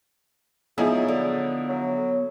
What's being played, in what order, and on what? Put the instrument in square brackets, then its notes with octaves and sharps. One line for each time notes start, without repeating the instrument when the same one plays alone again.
[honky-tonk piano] F3 D#4 E4 [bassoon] F#3 [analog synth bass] B3 [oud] G#4
[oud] D3
[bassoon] F#3